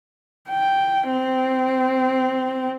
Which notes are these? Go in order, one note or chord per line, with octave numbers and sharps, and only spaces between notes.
G5
C4